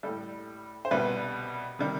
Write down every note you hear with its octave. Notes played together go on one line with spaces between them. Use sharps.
A2 G3 A4
C5
C2 B2 G3 B4
C3 D#3 G3